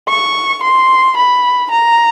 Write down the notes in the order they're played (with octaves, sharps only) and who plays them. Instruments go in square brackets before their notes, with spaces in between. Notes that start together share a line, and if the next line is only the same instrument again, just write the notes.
[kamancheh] C#6
C6
B5
A#5